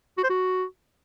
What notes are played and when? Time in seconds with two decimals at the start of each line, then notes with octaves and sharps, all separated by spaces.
0.18 F#4
0.24 C5
0.30 F#4